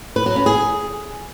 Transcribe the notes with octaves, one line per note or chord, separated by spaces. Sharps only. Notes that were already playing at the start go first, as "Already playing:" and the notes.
B4
F#3
C#4
G#4